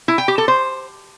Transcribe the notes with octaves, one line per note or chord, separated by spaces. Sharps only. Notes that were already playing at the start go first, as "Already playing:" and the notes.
E4
G5
G4
A4
C5